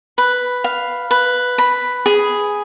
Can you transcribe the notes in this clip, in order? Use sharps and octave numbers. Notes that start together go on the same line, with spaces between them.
B4
F5
B4
B5
G#4